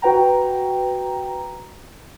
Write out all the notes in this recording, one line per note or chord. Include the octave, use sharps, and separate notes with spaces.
F#4 B4 G5 A#5